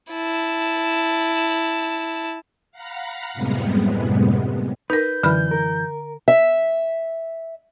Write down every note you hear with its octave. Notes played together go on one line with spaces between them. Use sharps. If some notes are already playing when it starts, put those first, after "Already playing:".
E4 A5
F5 F#5 A#5 B5
F#2 A2 C3 G3 G#3 B3
D#4 A#4 B4 G6
F#2 D3 E3 B5 F6
A#4
E5